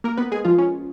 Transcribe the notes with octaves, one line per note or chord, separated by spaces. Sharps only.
A#3 A#4
B3 B4
G#3 G#4
F3 F4
C#4